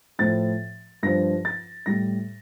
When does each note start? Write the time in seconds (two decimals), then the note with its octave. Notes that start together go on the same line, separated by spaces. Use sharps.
0.19 A2 F3 A6
1.03 G2 F3 A#6
1.45 A6
1.86 A2 G3 A#6